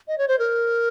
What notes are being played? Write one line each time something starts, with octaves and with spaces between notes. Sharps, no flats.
D#5
C#5
C5
A#4